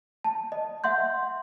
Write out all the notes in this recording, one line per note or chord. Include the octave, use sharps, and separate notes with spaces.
A5
D#5
E5 F#5 C6 G6